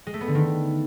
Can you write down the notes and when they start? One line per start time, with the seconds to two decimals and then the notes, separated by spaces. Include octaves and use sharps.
0.07 G#3
0.14 A3
0.21 B3
0.28 D3
0.35 D#3